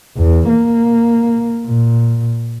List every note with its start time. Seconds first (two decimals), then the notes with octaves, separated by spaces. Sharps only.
0.17 E2
0.49 A#3
1.66 A#2